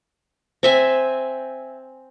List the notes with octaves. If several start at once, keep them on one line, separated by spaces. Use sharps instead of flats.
C4 E5 G#5